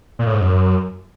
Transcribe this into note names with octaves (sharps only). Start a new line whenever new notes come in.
A#2
A2
G#2
F#2